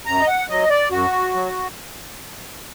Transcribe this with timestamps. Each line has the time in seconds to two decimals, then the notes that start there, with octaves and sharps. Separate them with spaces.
0.06 F#2 A#5
0.20 D#5
0.27 F#5
0.49 F#3 D#5
0.70 D5
0.91 F#2 F#4
1.34 F#3